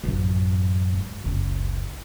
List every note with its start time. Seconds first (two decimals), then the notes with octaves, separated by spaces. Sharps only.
0.04 A1 F#2
0.94 G#2
1.24 F#1 C#2